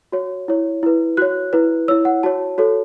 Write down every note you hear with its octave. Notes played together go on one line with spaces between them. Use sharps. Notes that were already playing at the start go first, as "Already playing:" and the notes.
F#4 C#5
E4 C#5
E4 B4
F#4 C#5 F#6
E4 B4
E4 C#5 E6
F#5
F#4 C#5 A5
F#4 A4 C#5